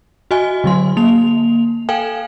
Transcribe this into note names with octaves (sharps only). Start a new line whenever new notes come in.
F#4 D#5 G#5
D3 F#3 C6
A#3 F7
A4 F5 G5 G#5